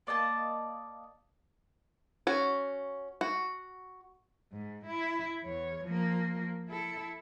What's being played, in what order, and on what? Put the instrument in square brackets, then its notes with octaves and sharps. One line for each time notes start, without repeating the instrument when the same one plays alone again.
[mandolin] A#3 D5 D#5 A5
[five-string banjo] C#4 F#4
F#4
[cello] G#2
E4
E2 C#5
F3 A#3
E4 A4